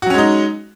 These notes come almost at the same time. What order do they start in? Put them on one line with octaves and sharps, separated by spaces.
F#4 F#3 C#4 G#3 D#4